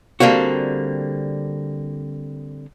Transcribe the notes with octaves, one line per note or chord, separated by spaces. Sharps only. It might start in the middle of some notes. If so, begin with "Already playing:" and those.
D3 G3 A#3 C4 F#4